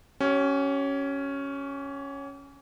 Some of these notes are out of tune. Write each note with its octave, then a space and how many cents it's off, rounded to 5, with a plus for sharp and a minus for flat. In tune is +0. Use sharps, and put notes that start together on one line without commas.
C#4 +0 G4 -45